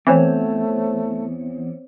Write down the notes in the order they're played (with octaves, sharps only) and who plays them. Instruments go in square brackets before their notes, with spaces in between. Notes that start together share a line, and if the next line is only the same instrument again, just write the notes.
[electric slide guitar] E2 [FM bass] E3 [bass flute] A3 [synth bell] C4 C5 C#5